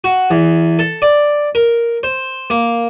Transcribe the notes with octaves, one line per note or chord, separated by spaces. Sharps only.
F#4
E2
A4
D5
A#4
C5
A#3